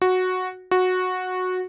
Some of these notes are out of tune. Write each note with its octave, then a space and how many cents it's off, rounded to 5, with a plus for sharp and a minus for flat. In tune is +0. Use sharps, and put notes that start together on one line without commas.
F#4 -5
F#4 -10